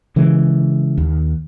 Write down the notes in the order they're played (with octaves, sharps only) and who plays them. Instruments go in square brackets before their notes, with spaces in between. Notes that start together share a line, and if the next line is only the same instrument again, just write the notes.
[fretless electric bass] C#3 E3 G#3
D#2